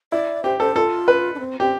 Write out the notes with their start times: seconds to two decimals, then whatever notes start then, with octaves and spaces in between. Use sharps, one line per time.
0.12 E4 D5
0.44 G4 C5
0.60 A4 C5
0.75 F4 A4
1.08 B4
1.35 D4
1.39 C4
1.60 C4 G4